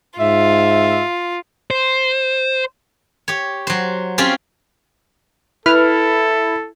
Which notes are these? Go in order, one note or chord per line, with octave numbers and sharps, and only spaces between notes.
G#2 F4 E5
C5
G4 C#5
F#3 C5
C4 C#4 F4 G4
E4 A4 B4 F6